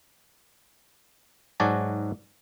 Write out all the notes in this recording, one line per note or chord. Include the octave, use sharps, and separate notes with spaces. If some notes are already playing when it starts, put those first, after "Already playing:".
G#2 F#3 F#4 D5 G#5 A5